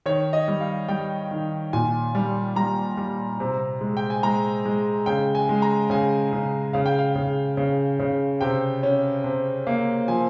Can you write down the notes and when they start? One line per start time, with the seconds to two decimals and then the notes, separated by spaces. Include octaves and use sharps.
0.06 D#3 C#5
0.33 D#5
0.48 G3
0.61 F5
0.88 G3 G5
1.31 D#3
1.73 A#2 G#5
2.15 G3
2.56 G3 A#5
2.97 G3
3.40 C3
3.81 G#3
3.97 G5
4.10 G#5
4.23 G#3 A#5
4.65 G#3
5.06 C#3 G5
5.35 G#5
5.49 G#3
5.62 A#5
5.90 C#3 G#5
6.33 C#3
6.73 C#3 F5
6.86 G5
6.98 F5
7.15 C#3
7.57 C#3
8.00 C#3
8.41 C3 G5
8.83 C#4
9.24 C3
9.67 A#3
10.08 F3 G#5